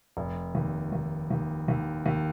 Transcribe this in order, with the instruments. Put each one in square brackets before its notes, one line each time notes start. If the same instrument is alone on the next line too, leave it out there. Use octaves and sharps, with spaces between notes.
[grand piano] F1
D#2
D#2
D#2
D#2
D#2